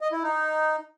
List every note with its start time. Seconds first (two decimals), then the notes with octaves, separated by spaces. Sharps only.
0.01 D#5
0.12 E4
0.23 D#4